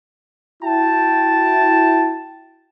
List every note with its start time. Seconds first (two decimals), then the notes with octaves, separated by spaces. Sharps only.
0.63 E4 F#4 G5 A5